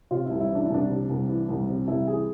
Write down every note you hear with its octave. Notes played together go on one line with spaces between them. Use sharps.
C3 F4
E4
C2
E4
E3 D4
E4
C2 D4
C3
C2
E3
C2
C3
C2 E4
E3 G#4